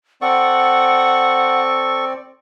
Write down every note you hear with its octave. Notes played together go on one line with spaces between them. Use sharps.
C4 A4 D5 F#5 C#6